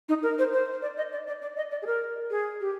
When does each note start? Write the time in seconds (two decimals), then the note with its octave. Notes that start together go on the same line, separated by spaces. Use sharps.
0.09 D#4
0.23 A#4
0.39 C5
0.53 C5
0.82 D5
0.97 D#5
1.12 D5
1.27 D5
1.42 D5
1.57 D#5
1.71 D5
1.82 G#4
1.87 A#4
2.30 G#4
2.60 G4